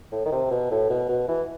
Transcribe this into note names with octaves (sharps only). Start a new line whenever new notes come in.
A2
D#3
C3
B2
A2
B2
B2
E3